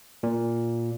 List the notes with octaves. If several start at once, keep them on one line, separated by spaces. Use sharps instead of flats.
A#2